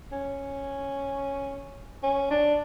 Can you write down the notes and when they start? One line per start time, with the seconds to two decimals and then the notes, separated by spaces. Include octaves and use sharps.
0.12 C#4
2.03 C#4
2.31 D4